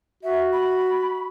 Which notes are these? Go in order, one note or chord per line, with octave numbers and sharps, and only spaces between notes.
F#4 E5
B5